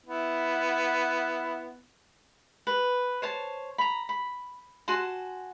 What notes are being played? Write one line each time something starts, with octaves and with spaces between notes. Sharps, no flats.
B3 E4
B4
C5 C#5 A5
A#5 B5
B5
F#4 G#5 A5 C6